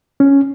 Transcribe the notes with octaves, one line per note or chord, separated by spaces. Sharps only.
C#4